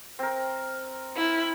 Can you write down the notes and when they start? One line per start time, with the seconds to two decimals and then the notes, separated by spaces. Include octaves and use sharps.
0.19 C4 A#4
1.16 E4